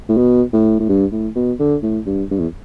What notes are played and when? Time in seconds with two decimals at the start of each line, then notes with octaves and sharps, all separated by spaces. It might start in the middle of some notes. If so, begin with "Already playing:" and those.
0.09 A2
0.17 B2
0.53 A2
0.80 A2
0.89 G2
1.12 A2
1.36 B2
1.59 D3
1.83 A2
2.06 G2
2.31 G2
2.39 E2